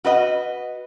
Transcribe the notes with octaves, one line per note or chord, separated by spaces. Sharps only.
F#4 B4 D#5